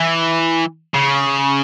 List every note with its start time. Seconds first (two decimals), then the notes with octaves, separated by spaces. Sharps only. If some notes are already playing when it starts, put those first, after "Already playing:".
Already playing: E3
0.94 C#3